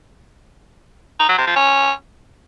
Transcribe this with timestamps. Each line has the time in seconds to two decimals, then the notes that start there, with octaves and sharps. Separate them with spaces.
1.20 D#4
1.29 F#3
1.38 C3
1.47 F3
1.56 C#4